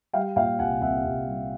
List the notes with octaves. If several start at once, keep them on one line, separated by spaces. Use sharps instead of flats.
G3 F5 G5
A#2 F5 G5
C2 F#5 G#5
C2 E5 F#5
C2
G3